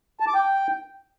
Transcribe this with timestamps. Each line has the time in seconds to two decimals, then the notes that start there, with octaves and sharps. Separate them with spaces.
0.20 A5
0.27 D6
0.35 G5